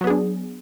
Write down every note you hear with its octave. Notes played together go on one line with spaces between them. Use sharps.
F#3 B3 D4 G#4